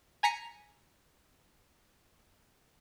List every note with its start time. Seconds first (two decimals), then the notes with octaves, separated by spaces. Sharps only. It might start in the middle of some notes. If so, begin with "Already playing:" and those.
0.23 G#5 A#5 B6 C#7